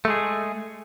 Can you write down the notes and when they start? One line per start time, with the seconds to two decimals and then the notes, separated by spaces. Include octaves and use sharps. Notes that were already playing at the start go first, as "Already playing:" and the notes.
0.05 A3
0.08 G#3
0.10 G#4